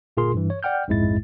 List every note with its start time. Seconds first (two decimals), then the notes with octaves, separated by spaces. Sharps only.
0.17 G1 A#2 F4 G#4 A#4 C6
0.34 G2 E3
0.50 C#5
0.63 D5 F#5 G5 F6 G6
0.88 A#1 F2 G#2 G#3 E4 A6